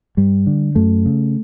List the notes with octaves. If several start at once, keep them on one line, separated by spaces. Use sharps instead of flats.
G2 G3
D3
F#2 A3
C#3